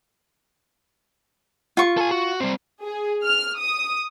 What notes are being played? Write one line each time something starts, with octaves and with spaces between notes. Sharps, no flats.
F4 C#6
A4 G#5
F#4
G3 C4
G#4
F6
D#6